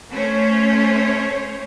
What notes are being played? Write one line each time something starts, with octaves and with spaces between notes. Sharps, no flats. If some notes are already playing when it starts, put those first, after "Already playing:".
A3 C#4 C5 C#5